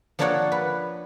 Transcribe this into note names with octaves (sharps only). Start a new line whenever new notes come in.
F3 A#3 D4 A4 C#5 F#5
B4